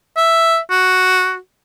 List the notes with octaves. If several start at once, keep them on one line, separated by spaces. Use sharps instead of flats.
E5
F#4